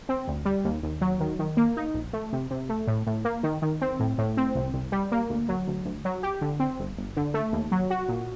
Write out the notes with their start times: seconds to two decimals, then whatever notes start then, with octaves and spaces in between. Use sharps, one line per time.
0.09 C4
0.27 D2
0.45 G3
0.65 D#2
0.83 D#2
1.01 F#3
1.20 D#3
1.39 D#3
1.57 A#3
1.77 D#4
1.94 A#1
2.13 A3
2.33 C3
2.51 C3
2.69 A3
2.87 A2
3.07 A2
3.25 A#3
3.43 D#3
3.62 D#3
3.81 C4
3.99 A2
4.18 A2
4.37 C4
4.55 C2
4.73 C2
4.92 G3
5.12 A#3
5.30 D2
5.49 F#3
5.67 D2
5.85 D2
6.05 F#3
6.23 G4
6.41 D3
6.60 C4
6.79 G1
6.97 G1
7.16 D3
7.34 A3
7.53 D#2
7.72 F#3
7.90 F#4
8.08 A#2